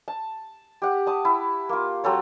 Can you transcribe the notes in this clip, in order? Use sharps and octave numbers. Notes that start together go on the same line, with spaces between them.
A5
G4 F#5
A5 D#6
E4
A#3 F4
F#3 C4 A4 C#5